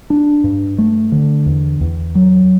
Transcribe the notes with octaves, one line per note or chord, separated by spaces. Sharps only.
D4
G2
A3
D3
E2
E2
F#3